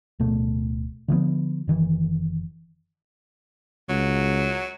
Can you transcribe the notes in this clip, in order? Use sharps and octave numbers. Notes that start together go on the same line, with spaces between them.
D1 B2 A3
D3 F3 G#3 B3
F#1 D#3 E3
C#2 F#3